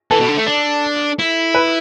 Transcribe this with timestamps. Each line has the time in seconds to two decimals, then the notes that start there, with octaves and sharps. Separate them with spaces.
0.11 E3 A4
0.19 B2
0.28 D3
0.37 A3
0.46 D4
1.19 E4
1.55 B4